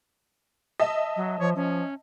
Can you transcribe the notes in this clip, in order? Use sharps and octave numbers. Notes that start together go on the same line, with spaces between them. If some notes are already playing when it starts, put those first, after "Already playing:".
D#5 E5 A5
F#3
F3 C#5
F3 C#4